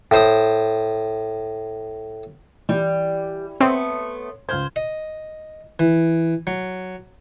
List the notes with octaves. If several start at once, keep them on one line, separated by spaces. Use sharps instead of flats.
A2 C5 D#6
E3 G3 E4 G4
A3 B3 C4 C5 C#5 C6
C#2 C5 F6 G#6
D#5
E3
F#3